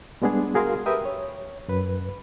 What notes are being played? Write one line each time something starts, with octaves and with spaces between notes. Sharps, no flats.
G3 G#3 B3 D4 G#4
F#4 G#4 A#4 F5 C6
G4 A#4 B4 E5 G5 D#6
C#5
F#2 B4